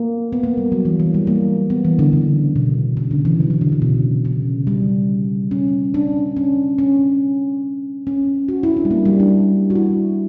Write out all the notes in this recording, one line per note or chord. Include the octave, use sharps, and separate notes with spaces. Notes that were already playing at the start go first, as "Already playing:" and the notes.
Already playing: A#3
B3
A#3
G3
F#3
E3
E3
G3
A#3
B3
E3
D3
C#3
B2
C#3
D3
E3
F#3
E3
D3
C#3
B2
C#3
G3
C#4
D4
C#4
C#4
C#4
F#4
E4
D4
G3
A#3
G3
D4
F#4
E4